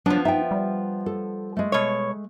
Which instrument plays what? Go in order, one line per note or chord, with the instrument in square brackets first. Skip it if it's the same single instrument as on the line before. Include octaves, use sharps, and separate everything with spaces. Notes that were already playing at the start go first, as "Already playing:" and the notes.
[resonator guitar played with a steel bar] F3 B3 [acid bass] F#3 [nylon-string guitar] D4
[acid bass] D#4 [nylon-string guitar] E5 G5
[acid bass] G3
[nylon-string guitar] A4
G#3 A3
[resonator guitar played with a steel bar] B2 C#5